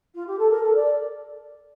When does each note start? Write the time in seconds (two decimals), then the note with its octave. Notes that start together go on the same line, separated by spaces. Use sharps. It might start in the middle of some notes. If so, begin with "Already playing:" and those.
0.15 F4
0.27 G4
0.38 A4
0.50 A#4
0.62 A4
0.75 D5